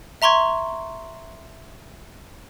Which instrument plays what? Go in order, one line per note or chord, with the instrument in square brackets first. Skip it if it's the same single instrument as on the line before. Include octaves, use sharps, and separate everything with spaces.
[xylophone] E5 A#5 C6 C#6 G#6